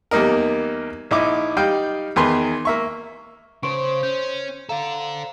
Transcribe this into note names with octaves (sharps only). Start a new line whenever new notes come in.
E2 G3 A#3 D#4 A#4
A#1 D#4 E4 D6
G3 D#4 F5 G5
E2 D#3 G#4 B4 C6
A#3 E5 C#6
C#3 C5 C#6 D7
C#4 G6
A4 D5 F5 A#5